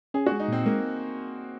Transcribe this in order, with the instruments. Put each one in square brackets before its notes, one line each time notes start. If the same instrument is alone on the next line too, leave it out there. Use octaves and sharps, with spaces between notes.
[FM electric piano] C#4 [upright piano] G#4
[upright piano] F#4
[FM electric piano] G#3
[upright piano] D#4
[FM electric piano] A#2 [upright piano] C4
[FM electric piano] G#3 [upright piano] A#3